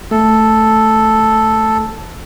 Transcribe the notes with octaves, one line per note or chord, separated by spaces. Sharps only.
A3 A4